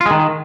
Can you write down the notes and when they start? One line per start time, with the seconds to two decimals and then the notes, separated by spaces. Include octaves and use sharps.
0.01 F4
0.06 G#3
0.11 D#3